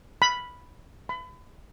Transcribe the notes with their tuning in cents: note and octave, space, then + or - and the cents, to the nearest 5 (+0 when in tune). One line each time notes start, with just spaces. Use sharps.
B5 +0
B5 +30